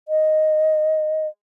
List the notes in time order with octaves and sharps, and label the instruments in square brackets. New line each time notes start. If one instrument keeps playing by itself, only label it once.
[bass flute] D#5